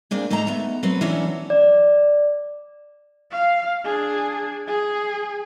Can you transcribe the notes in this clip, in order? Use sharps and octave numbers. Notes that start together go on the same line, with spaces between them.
A#3 C4 D4 G#4
G#2 A3 D#4 A4 A#5
A3 B3
F#3 C4 B4
E3 F#3 B3 C#4 D4 E4
D5
F5
D4 G#4
G#4